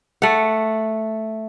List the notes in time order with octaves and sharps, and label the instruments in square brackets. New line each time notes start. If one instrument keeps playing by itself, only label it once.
[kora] A3 F#5